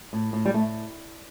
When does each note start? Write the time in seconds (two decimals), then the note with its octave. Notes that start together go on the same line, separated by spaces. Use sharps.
0.13 A2
0.33 A2
0.46 G3
0.54 A2 A3